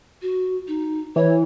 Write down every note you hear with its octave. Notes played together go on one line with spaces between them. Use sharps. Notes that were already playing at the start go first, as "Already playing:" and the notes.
F#4
D#4
E3 C#5